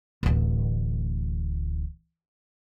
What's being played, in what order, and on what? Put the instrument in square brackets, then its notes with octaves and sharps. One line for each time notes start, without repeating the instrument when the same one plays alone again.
[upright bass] D1 A1